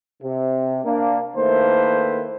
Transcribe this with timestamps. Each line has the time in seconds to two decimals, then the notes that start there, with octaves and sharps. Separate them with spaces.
0.23 C3
0.84 A#3 D4
1.36 D#3 A3 A#3 E4 B4 C5